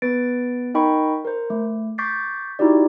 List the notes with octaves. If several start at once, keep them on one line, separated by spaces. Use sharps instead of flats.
B3 B4 A6 D7
D#4 A#4 D#5 G5 B5 C#6
A#4 C5
A3
C#6 D6 G6 A6 B6 C7
D#4 E4 F#4 G4 D5